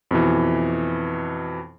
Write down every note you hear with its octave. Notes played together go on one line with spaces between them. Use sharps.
F2 B2 E3